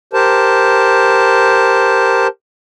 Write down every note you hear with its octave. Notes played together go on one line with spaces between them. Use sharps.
G4 A#4 C5 A5